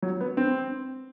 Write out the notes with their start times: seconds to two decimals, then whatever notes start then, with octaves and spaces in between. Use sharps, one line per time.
0.02 F#3
0.21 B3
0.37 C4